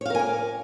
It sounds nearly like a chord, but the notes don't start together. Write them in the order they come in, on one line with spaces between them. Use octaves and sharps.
C#5 F5 A#4 G#5 D5